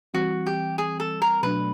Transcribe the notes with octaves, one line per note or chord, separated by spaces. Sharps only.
E3 G3 C4 F#4
G4
G#4
A4
A#4
B2 F#3 A3 D4 B4